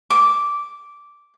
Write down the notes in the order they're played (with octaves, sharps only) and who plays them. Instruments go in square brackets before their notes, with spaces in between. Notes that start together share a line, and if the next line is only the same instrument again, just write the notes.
[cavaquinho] D6